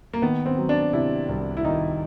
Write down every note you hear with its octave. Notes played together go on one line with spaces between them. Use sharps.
A#3
D#3 B3
C4
F#3
D4
C3 E4
C2
E4
D#3 D#4